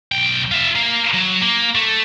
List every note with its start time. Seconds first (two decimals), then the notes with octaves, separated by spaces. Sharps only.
0.12 B1 G5
0.52 F4 E5
0.75 A#3 F5
1.14 F#3
1.42 A#3
1.75 A3